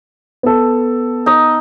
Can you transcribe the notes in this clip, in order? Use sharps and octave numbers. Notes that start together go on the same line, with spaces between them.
B3 A4
D#4 D#5